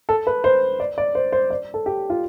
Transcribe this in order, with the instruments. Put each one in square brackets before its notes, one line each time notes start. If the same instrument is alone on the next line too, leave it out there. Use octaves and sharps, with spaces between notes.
[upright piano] A4
B4
C5
D5
D5
C5
C5
D5
A4
G4
F4